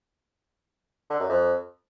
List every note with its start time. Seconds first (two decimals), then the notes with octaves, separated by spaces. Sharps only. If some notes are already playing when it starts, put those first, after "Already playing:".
1.10 D3
1.20 F#2
1.29 F2